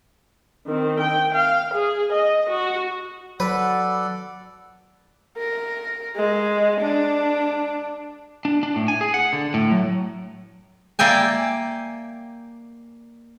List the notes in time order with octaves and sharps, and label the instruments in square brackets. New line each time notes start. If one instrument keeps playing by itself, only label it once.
[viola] D#3 C4
G5
F5
G#4
D#5
F#4
[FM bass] F#3 [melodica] A4 D5 [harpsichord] B4 [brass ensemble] F#5
[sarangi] A#4
G#3
D4
[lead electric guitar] D4
D4
A2
G#5
G#4
F#5
D3
A2
F#3
[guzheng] A#3 D5 E5 G5 G#5